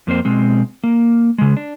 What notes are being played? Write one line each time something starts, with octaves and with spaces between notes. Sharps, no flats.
F2 A#3 C4 C5
B2 G#3 C4
A#3
C#3 G#3
D4